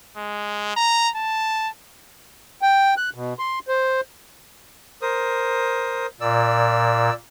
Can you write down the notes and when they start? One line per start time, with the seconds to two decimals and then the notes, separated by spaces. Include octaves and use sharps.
0.17 G#3
0.76 A#5
1.15 A5
2.62 G5
2.97 F#6
3.14 B2
3.39 C6
3.68 C5
5.02 A#4 C5 D#6
6.21 A#2 D5 E6